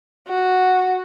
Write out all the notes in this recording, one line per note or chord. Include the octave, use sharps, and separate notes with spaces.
F#4